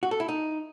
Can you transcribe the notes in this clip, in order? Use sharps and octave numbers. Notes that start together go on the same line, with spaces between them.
F#4
A4
E4
D#4